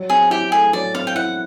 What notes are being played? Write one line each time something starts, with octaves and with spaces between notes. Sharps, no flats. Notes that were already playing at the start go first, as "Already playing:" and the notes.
Already playing: F#3
C4 G#4
E4 G4
A3 G#4
F#3 D5
C4 F5
G5
E4 F#5